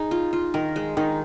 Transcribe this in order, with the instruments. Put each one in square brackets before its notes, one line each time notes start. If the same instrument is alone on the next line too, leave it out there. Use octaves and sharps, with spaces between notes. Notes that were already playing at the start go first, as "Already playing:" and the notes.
Already playing: [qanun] D#4 G#4
F4
F4
[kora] D#3 [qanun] A#4
[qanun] G#3
[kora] D#3 [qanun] D#4